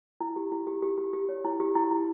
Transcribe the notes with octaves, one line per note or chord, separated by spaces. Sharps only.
E4
G4
E4
G4
G4
G4
G4
C#5
E4
G4
E4
E4